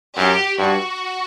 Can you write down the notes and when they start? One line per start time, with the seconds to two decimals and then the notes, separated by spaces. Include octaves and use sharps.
0.17 F#2 G4
0.58 G2 F#4